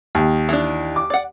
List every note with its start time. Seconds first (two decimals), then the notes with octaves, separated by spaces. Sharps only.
0.15 D#2
0.49 E3 D4
0.96 D6
1.10 D5 F#5